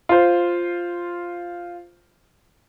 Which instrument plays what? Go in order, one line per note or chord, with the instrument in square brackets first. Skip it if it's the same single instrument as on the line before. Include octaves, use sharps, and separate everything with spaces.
[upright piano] F4 C5